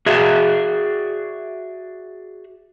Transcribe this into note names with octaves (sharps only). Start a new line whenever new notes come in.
F#4 G#4 D5 E5